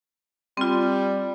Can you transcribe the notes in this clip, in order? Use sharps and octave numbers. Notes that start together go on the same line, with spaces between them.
G3 C4 F4